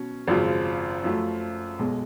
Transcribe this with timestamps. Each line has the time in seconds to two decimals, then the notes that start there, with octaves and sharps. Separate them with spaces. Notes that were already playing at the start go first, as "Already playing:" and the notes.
Already playing: B2 F#3 C#4
0.28 G#1 F#2 C#3 F3
1.04 F#2 F3 A3
1.79 B1 B2 G#3